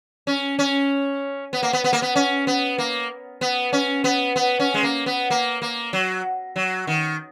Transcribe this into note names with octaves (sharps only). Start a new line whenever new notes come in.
C#4
C#4
B3
A#3
B3
B3
A#3
B3
C#4
B3
A#3
B3
C#4
B3
B3
C#4
G#3
A#3
B3
A#3
A#3
F#3
F#3
D#3